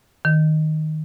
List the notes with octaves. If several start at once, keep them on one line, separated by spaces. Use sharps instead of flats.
D#3